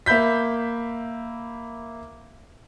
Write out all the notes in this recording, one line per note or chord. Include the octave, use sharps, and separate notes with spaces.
A#3 E5 B5 G6 B6